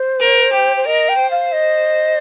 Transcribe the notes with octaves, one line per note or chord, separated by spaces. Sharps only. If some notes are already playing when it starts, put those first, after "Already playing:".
Already playing: C5
A#4
G4
C5
A#4 D#5
G5
C5
F5
D#5